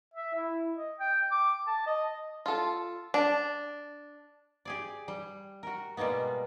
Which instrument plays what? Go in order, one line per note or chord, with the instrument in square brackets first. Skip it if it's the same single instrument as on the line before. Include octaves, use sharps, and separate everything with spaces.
[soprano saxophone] E5
E4
D#5
G5
D6
A5
D#5
[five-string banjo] F4 A4
D4
[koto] G4 G#4 D5
G3
F#4 A#4
B2 G3 G#3 A#3 B3